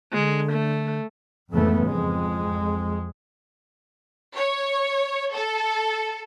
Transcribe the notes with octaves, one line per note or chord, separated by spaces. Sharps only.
D3 G#3
A3
F2 G#2 C#3 E3 A3 B3
F2 G#3
C#5
A4